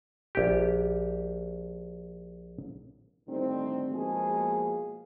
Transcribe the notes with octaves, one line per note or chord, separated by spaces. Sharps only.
A#1 G4
A2 D3 D#3 G3 C4
B2 F3 G#3 A#3 F#4 G#4